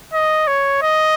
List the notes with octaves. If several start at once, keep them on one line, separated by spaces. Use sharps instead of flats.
D#5
C#5
D#5